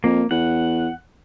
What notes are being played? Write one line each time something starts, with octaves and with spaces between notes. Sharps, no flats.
F2 A#3
E2 F#5